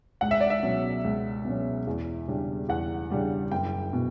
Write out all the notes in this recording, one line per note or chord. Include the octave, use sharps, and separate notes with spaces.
C#2 F#5
E5
D5
E5
B2 F#3 C#4
C#2
B2 F#3 C#4
E2
C#3 G3 D4
E2 F#5
C#3 G3 D4
F#1 G5
B2